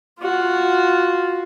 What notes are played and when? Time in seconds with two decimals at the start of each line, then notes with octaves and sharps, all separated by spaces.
0.19 F4 F#4